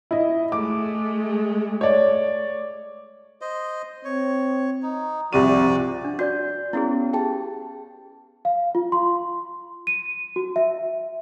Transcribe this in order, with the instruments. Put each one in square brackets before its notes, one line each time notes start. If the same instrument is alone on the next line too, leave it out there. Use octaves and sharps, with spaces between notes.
[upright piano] E4 D#5
[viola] G#3 A3 [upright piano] D6
[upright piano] C#5 D5
[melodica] C5 D#5
[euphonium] C4 [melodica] C#5
[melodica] D#4
[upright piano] C2 C3 D#7 [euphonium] F3 [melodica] F#4 D5
[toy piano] D4
[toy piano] F#4 D5 [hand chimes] G6
[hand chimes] B3 C#4 [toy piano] E4 F#4 G#4
[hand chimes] G4 G#4 A5 [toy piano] G5
[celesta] F5
F4
C6
D#7
F#4
E5